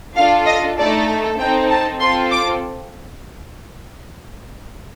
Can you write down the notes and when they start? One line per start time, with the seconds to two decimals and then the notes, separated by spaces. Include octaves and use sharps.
0.16 D4 F4 A4 F5
0.47 D#5
0.78 A3 D#4 A4 D5
1.39 C4 D#4 A4 G5
1.70 A5
2.00 C4 F4 A4 C6
2.32 D6